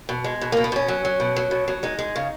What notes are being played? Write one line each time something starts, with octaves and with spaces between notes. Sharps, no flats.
B2
G#3
B2
B2 A#3
B3
B2 C#4
F#3
F#3
B2
F#3
B2
F#3
G#3 D#4
G#3
C#3